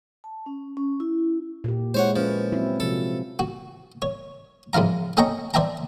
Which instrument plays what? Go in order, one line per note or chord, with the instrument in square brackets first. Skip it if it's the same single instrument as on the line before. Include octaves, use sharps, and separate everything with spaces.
[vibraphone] A5
C#4
C#4
E4
[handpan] A#2 G4
[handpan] G#3 E4 [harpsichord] C5 C#5 F#5
[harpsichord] F3 [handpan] A#3 C#4 B4
[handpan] F#3 C4 E4
[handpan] C3 F3 F#4 [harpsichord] A4
[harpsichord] F#4
C#5
G#2 F3 E4 F5 A#5
C#4 A4 D#5 G5 A#5 C#6
C5 D5 E5 G5 A5 A#5